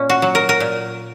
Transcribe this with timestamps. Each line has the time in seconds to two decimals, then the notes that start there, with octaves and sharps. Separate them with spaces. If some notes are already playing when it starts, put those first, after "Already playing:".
Already playing: A#2 A#3 C#4
0.09 F#4
0.22 F#3
0.35 A#4
0.49 A#4
0.60 A#2